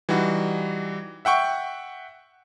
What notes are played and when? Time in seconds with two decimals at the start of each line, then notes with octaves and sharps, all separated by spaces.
0.09 E3 G3 D#4 F#4
1.25 E5 F#5 G5 C#6